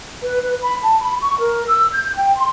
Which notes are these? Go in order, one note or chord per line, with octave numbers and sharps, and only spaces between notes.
B4
B4
B5
A5
B5
C#6
A#4
E6
G6
G5
C6